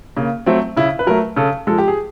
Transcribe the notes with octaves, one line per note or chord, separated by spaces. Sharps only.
C#3 A#3
F#3 A3 C4
C#3 E4
B4
F#3 A3 A#4
C#3 A4
F3 G#3 A4
G4
G#4